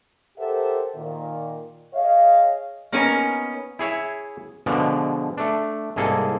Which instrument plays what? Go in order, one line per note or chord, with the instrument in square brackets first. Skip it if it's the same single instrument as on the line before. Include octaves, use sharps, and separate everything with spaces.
[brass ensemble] G4 A4 A#4 C5 E5 F#5
A#2 D#3
G#4 C#5 D#5 F5
[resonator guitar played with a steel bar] A#3 B3 C#4 D#4 A#4 G#5
[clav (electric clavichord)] E4 G#4 C#5 E5
B2 D3 F3 G#3
A3 D4
C2 G#2 A#3 G#4 A4